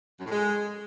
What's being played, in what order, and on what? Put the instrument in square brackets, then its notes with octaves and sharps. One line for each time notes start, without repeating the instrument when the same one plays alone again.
[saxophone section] F#2
A2
G#3